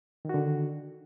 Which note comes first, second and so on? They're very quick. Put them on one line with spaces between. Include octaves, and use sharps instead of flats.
D#3 F#4 D3